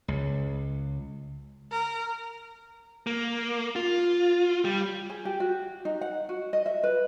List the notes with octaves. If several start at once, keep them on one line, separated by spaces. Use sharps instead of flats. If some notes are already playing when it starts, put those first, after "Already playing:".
C#2
A#4
A#3
F4
G3
G#4
G4
F#4
D#4
F#5
F#4
D#5
E5
B4